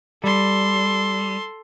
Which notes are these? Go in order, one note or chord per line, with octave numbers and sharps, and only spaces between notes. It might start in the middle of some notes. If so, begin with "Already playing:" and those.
G3 A4 C6